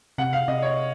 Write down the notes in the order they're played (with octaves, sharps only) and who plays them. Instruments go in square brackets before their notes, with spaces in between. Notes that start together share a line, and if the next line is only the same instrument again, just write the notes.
[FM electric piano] C3 [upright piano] F#5
[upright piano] F5
[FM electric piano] C3 [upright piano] D#5
[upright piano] C#5